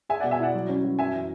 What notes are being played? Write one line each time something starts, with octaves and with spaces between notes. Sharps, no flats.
G#4 E5 G#5
D5 F#5
B2
E5 G#5
E4 D5 F#5
F#3
C#4
F#3
F#2 E5 G#5
E3